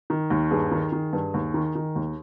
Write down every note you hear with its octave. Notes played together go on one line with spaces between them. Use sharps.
D#3
D#2
G2 G#4
D#3
D#3
G2
D#2
D#3
D#3
D#2